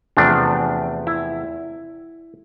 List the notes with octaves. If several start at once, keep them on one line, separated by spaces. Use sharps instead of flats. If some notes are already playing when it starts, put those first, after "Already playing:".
E2 C3 F3 A3 D4
E4